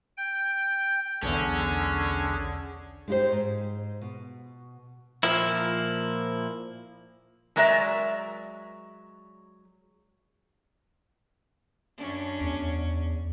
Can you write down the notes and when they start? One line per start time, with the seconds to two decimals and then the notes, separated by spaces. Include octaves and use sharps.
0.17 G5
1.23 B1 E2 D3 C#4 D4 G#4
3.08 G#3 D#4 F4 G4 C5
3.32 G#2
4.01 B2
5.23 A#2 F3 A#3 E4
7.56 F#3 G#3 A#4 D5 E5
11.98 F#2 C#4 D4
12.41 E2